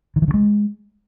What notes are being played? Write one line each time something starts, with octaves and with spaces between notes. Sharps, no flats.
D#3
E3
D3
G#3